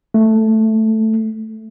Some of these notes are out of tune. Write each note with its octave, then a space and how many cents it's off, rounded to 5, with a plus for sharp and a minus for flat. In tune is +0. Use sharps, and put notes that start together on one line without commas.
A3 +0